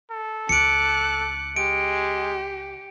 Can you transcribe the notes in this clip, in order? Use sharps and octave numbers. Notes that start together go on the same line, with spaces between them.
A4
C#2 D6 F#6 C#7 D7
G#3 G4 D7